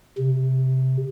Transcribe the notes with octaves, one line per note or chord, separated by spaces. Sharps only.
C3